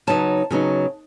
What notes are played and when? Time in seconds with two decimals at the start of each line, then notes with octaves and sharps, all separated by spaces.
0.07 C#3 F#3 B3 D#4 A5
0.51 C#3 F#3 B3 D#4